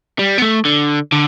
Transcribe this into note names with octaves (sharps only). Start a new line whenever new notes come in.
G3
B3
A3
D3
D3